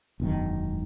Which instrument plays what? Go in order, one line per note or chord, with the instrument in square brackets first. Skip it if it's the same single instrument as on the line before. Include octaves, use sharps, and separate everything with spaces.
[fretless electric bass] E1 F#2 D#3